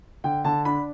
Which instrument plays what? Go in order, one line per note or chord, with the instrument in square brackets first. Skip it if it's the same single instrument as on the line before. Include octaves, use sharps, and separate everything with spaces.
[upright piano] D3 G5
D3 A5
D4 B5